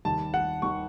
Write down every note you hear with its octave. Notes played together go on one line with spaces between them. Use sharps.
D#2 D#3 G3 A5
F#5
D#2 D#3 G3 C#6